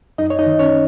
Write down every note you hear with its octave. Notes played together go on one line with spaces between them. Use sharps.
F#2 D#4 D#5
C#5
D#4 D#5
D#3
C#4 C#5